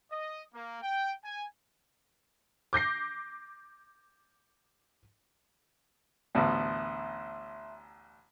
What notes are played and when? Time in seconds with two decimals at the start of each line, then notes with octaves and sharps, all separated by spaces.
0.10 D#5
0.54 A#3
0.82 G5
1.23 G#5
2.73 D6 G6 A#6 C7
6.35 A1 D2 B3 E5 C6